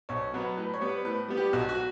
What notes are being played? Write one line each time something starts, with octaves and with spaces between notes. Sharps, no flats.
B1 C#5
B2 F#3 B3
A2 B4
C#5
G3 B3
B4
A2 B4
G3 B3
G4
B1 F#4
F#4